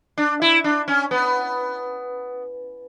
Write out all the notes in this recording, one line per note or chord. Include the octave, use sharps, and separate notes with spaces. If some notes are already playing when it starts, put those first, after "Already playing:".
D4
E4
D4
C#4
B3